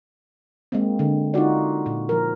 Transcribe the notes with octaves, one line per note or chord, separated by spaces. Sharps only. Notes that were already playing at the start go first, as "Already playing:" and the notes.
G#3 A#3 C4
D3
D#4 F4 F#4 D5
A#2
F3 A#4